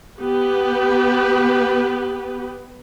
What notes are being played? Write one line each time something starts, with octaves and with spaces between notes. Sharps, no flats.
B3 G4 B4